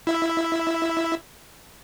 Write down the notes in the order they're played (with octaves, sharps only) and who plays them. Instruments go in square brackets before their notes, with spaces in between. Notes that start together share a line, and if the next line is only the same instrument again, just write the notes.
[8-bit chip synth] E4 E5